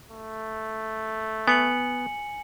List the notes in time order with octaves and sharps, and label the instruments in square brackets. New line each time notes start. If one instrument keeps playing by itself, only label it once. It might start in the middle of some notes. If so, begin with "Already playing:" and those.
[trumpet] A3
[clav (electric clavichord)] B3 [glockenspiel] G#5 C#7 F#7